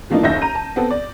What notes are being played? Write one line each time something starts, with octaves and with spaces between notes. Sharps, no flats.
E3 F3 A3 A#3 D4 D#4
F#1 D#2 D#4 E5 G6 A#6
A#5 D#7
A5
B3 C4 A4
D5